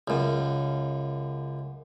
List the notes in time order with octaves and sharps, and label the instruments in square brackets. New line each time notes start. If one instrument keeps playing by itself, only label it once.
[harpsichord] C#2 F#2